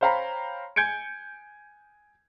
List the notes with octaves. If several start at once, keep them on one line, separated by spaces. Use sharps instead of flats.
C5 C#5 F5 G5 A#5 B5
G#5 G6 G#6 C#7 D7